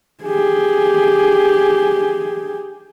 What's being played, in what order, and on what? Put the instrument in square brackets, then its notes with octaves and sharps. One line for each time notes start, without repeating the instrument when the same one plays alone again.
[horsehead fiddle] G4 G#4